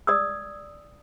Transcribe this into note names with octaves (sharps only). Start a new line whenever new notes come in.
D5 D#6 E6